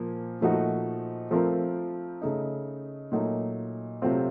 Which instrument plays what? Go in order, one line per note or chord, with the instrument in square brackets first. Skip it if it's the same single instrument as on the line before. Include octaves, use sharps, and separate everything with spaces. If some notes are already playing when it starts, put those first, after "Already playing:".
Already playing: [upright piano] A#2 F3 A#3
A#2 F3 A3 D#4 F#4
F3 A3 C4 F4 A#4
C#3 A3 D#4
A#2 F#3 A3 D#4
C3 F#3 A3 C4 F4